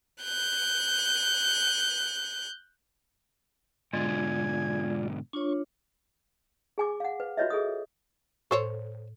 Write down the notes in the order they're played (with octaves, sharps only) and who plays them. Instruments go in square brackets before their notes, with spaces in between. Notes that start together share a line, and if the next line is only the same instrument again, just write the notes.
[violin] F#6 G6
[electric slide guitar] G#2 B2 D3 [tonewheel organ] G#3 F4 D5 [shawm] G#5
[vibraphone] D4 F4 C#5 [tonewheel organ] C#6
[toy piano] G#4 G#5 D6
F5 F#5
B4
F4 F#4 B4 C#5 D#5 E5
G#4 A4 D#6
[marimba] A2 [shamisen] A4 C5 C#5